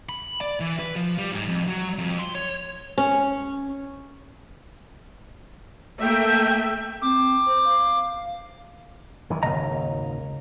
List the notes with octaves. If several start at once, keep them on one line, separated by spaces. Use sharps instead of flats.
B5
D5
E3
B4
F3
G3
G#2
F2
F#3
F2
C6
C#5
C#4
A3 A#3 E5 G5
C4 D6
C5
F5
F#2 D#3 E3
G#1 D#2 C#3 D#5 A#5